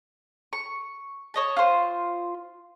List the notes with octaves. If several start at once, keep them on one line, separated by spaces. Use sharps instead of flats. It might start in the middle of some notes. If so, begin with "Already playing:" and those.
C#6
C#5 D#5 A5
F4 C5